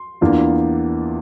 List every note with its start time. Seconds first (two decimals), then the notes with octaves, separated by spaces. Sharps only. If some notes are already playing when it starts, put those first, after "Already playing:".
Already playing: C6
0.21 E2 E3 A#3 D4 F4